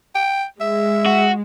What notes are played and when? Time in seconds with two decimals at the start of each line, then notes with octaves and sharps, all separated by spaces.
0.15 G5
0.60 G#3 E5
1.06 F#4